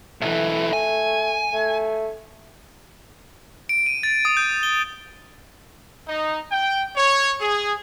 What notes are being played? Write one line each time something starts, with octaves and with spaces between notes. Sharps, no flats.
B1 E3 A3
G#5
A3
D7
D#7
A6
D#6
G6
G7
D#4
G5
C#5
G#4